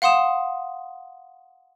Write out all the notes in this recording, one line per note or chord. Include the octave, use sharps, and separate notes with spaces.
F5 F#5 C6 D#6 E7